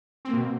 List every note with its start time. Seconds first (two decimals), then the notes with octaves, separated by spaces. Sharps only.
0.25 C4
0.29 A#3
0.33 B2